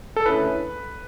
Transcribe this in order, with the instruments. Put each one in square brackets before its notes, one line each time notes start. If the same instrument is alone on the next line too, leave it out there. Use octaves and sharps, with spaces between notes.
[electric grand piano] A4
[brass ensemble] D3 A3 C#4 E4 G#4 [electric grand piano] B4